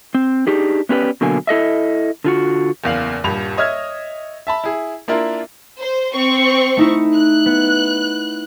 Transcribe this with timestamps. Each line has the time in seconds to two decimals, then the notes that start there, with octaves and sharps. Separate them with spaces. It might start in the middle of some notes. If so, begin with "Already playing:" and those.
0.15 C4
0.47 D4 D#4 G4 G#4
0.89 B3 C#4 G4 B4 D5
1.21 B2 D3 F#3 A#3 G#5
1.47 E4 A4 D#5 E5
2.24 D3 F4 F#4
2.84 F#1 E2 F5 F#7
3.24 D#1 G2 B5 F7
3.57 C#5 D#5 E5 F6 G#6
4.47 E5 A5 B5
4.64 E4 G#4
5.08 A#3 D4 E4 F4 A#4
5.80 C5
6.13 C4 C#6
6.77 A3 D#4 E4
7.14 F#6
7.46 B3